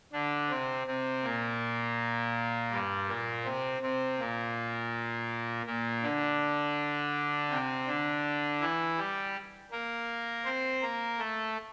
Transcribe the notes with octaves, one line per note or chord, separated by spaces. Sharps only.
D3 D4
C3 C4
C3 C4
A#2 A#3
G2 G3
A#2 A#3
C3 C4
C3 C4
A#2 A#3
A#2 A#3
D3 D4
C3 C4
D3 D4
E3 E4
G3 G4
A#3 A#4
C4 C5
A#3 A#4
A3 A4